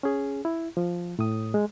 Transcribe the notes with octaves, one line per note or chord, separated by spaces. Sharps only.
C#4 G#4
E4
F3
A2 D#6
G#3